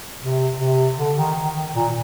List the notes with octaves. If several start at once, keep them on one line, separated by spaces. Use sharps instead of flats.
C3
C3
D3
D#3
D#3
D#3
A#2